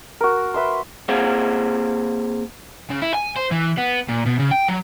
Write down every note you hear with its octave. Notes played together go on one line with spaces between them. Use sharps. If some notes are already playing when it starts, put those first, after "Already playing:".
F#4 A#4
B4 E5 C6
A#3 C4 G#4 C5 F5 F#5
C#3
E4
G#5
C5
E3
B3
A#2
B2
C#3
G5
F#3